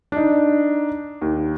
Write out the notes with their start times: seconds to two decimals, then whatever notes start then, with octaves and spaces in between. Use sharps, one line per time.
0.12 D4 D#4
1.22 D#2